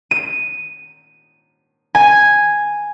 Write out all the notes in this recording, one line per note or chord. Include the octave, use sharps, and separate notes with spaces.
D#7
G#5